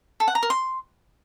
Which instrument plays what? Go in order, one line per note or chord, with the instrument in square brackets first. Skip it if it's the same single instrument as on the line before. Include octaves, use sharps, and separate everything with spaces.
[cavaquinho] A4
F#5
A#5
A#4
C6